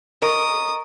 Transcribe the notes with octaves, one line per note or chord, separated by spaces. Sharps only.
A#4 D#5 A#5 C#6 D#6